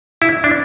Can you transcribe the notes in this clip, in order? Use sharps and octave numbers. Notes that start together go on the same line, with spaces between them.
E4
D4